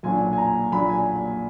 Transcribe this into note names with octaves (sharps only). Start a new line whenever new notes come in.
B1 A#2 F#3 D4 G#5
G#5
A#5
B1 A#2 F#3 D4 B5
G#5